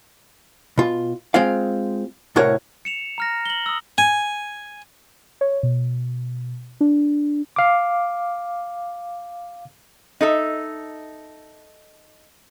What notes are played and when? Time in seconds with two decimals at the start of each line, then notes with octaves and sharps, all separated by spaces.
0.78 B2 F4
1.34 G#3 C4 F4 F5
2.36 C2 A2 F#4 A#4 C#5
2.85 C#7 E7 F7
3.18 A#5 F6 A#6
3.46 F#7 G7
3.66 D#6 E6
3.98 G#5
5.41 C#5
5.63 B2
6.81 D4
7.56 F5 D6
10.21 D#4 A4 E5